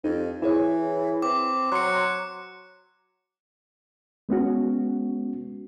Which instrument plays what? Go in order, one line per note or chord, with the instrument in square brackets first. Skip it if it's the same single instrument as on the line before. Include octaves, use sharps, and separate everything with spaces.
[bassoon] F2 [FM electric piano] D#4 G4
[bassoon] E3 [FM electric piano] E4 G#4 C#5
[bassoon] C4 [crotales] D6
[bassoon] F#3 [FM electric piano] A#5 C6 C#6 [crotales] F#6 C#7
[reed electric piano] G#3 B3 C#4 F#4